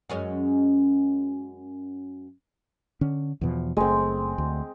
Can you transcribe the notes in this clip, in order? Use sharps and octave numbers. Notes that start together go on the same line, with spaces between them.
F#2 G#3 C#4
D3 C#4
E2 B2 F3
F#1 G#3 A3 C4
D2